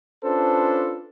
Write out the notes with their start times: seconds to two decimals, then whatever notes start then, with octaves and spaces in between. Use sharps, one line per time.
0.24 C#4 D4 F4 A4 B4 C5